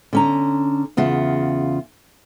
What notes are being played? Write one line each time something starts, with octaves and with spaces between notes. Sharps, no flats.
D3 C#4 A#5
E2 C#3 F4 F#5